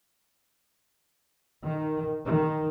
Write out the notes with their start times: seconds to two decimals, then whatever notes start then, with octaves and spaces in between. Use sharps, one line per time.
1.63 D#3
2.25 D#3